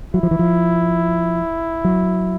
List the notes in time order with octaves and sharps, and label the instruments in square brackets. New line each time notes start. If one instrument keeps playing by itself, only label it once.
[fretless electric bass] F#3 [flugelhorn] E4
[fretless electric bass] F3
E3
F3
F#3